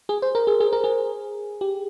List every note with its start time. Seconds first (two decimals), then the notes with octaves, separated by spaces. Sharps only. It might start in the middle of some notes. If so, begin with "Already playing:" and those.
0.09 G#4
0.22 C5
0.35 A#4
0.47 G#4
0.60 G#4
0.73 A#4
0.84 G#4
1.61 G4